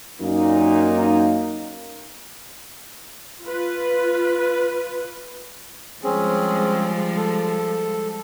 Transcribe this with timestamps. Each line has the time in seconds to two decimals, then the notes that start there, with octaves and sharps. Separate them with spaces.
0.21 F#2 A#2 A#3 D#4
3.43 F4 B4
6.03 F3 G3 G#3 C4 C#4 G#4
7.17 A4